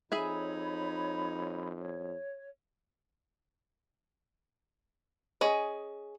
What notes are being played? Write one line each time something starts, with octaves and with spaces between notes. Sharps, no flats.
F2 D#4 G#4 C#5 E5 G#5 B5
C#5
C#4 G#4 D#5